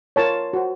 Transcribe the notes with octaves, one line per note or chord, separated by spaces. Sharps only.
F4 A#4 C#5 A5
F#4 C5